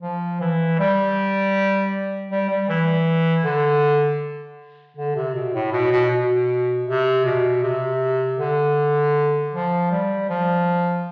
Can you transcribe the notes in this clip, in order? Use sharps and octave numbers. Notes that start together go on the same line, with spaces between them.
F3
E3
G3
G3
G3
E3
D3
D3
C3
B2
A2
B2
B2
B2
C3
B2
C3
D3
F3
G3
F3